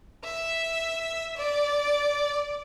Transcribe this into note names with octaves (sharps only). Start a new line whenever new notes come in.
E5
D5